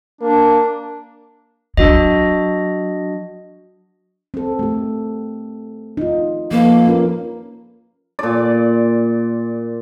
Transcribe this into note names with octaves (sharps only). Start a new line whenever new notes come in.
A#3 D4
F#3 D4 F#4 D#5
C4 A4
A3 G4
D#4 F4
F3 A#3 A4 B4
C#4 F4 A#4
A#2 D5